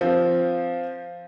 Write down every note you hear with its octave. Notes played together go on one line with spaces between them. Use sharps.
F3 C4